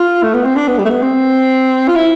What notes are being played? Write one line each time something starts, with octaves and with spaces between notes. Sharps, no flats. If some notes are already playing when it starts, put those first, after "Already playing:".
Already playing: F4
A3
B3
C4
D4
B3
G3
A3
B3
C4
F4
E4